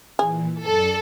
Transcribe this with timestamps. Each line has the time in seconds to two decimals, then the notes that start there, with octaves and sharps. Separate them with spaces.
0.19 A#2 E3 G#4
0.62 F#2 A4 D5